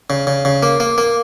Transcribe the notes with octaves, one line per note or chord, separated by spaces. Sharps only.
C#3
C#3
C#3
A#3
A#3
A#3